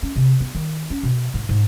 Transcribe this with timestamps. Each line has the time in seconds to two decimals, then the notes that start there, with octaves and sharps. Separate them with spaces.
0.03 C#4
0.16 C3
0.40 B3
0.55 D#3
0.90 C#4
1.03 B2
1.34 G#2
1.49 G#2